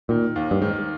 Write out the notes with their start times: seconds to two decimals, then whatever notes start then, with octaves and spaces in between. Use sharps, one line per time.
0.09 A#2 D#3
0.36 D#2
0.51 G2
0.61 G#2 D#3